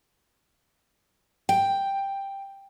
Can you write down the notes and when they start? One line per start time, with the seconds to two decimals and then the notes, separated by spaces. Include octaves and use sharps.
1.49 G5